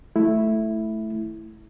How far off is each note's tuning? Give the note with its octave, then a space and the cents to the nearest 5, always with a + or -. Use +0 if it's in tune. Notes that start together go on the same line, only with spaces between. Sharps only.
A3 -10 E4 +0